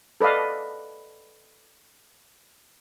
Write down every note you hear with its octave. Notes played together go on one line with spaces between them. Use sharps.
A4 B4 D5 D#5 F5